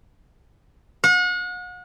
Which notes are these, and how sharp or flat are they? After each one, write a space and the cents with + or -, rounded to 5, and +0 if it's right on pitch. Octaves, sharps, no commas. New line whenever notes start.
F#5 -40